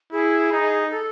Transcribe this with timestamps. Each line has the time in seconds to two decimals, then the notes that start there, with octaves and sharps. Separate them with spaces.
0.12 E4 G#4
0.52 D#4
0.91 A4